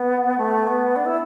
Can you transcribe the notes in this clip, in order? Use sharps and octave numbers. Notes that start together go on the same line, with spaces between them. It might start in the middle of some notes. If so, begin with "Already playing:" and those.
Already playing: B3
A3
B3
D4
E4